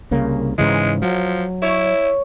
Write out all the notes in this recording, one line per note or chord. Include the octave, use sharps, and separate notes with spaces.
C2 C#3 A#3
G#2 C#3 E3 G#3
F3 F#3
E4 C#5